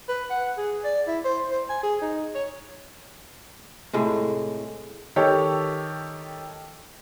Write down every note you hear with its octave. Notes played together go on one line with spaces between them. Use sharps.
B4
F#5
G#4
D5
E4
C5
C5
G#5
G#4
D#4
C#5
A2 C3 G#3
D#3 G4 A4 C#5